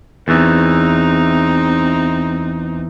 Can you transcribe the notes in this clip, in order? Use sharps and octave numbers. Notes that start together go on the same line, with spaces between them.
E2 E3 C4 D#4